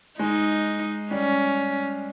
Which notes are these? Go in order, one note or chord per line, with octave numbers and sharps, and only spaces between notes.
G#3 D#4
G3 C#4